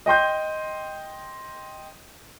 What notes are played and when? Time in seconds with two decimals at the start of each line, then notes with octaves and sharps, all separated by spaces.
0.06 D#5 G5 C6 G6